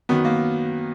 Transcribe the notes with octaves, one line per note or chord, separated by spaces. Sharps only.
F#2 D#3 F#3 B3
A#3